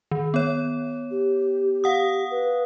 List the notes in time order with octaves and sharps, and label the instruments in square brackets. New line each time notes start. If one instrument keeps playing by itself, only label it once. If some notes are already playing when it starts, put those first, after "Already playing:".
[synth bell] D#3
B3 C#5
[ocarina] G4
[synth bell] F5 F#5 D#6
[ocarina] B4